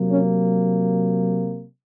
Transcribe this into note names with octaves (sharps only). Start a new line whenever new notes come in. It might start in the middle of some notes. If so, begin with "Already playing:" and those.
Already playing: C3 F#3 A#3
C#4